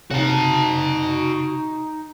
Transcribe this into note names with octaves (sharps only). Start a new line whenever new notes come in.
C3 D#4 F#4 A5